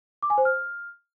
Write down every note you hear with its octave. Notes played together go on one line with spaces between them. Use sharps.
D6
G#5
C5
F6